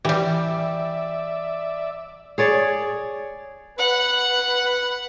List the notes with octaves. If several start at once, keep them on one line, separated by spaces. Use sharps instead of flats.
E3 G3 G4 D5 E5
G#4 C#5 D5
B4 F#5